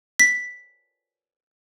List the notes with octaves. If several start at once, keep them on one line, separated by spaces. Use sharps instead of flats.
B6